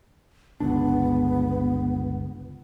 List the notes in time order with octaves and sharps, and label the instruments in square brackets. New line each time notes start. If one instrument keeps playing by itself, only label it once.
[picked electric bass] G1 C#2 D4 [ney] B3